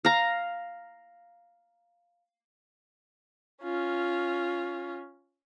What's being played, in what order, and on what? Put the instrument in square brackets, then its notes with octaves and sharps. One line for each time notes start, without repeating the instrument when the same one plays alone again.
[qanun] F5 A#5
[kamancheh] C#4 F4